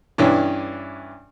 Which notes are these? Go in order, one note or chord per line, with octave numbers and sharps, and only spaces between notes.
G2 E3 C#4 D4